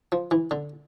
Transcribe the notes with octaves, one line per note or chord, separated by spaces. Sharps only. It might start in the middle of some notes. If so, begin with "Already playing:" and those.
F3
E3
D3